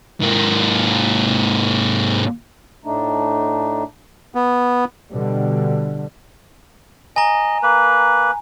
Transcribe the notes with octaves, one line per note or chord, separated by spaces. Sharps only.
G#2 A#3
A2 A3 D4 D#4
B3
B2 D3 G3
D#5 G#5 A#5
A#3 B4